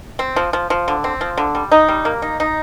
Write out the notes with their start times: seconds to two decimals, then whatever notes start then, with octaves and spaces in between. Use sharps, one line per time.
0.19 C4
0.36 F3
0.53 F3
0.70 F3
0.88 D3
1.04 C4
1.21 F3
1.38 D3
1.55 G3
1.72 D#4
1.88 G3
2.05 A#3
2.22 D#4
2.40 D#4